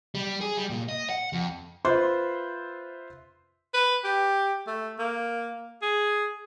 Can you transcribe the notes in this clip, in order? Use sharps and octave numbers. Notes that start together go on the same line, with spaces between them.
G3
G#4
G3
A#2
D#5
F#5
F2
F4 B4 C5 E5 C6
B4
G4
A3
A#3
G#4